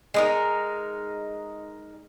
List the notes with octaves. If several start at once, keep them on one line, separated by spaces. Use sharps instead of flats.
G#3 D#4 A#4